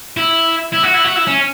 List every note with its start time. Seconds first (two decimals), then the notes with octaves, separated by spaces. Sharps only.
0.17 E4
0.72 E4
0.83 F#4
0.94 E4
1.04 F#4
1.16 E4
1.27 C#4